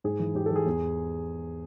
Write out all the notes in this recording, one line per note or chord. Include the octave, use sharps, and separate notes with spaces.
G#2 G#4
E3
G#2 G4
A4
E3
G#4
E2